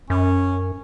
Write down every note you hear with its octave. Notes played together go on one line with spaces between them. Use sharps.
F#2 C#4